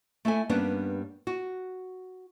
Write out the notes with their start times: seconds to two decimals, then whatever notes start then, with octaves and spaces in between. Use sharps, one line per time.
0.25 A3 E4 A4 G#5
0.49 G2 G3 A#3 B3 C#4 D4
1.27 F#4